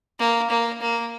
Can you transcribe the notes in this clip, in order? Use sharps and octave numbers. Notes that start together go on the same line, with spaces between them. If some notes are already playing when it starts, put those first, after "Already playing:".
A#3
A#3
A#3